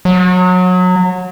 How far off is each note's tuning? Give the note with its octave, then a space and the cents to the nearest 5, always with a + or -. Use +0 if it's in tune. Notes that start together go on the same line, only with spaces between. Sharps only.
F#3 -25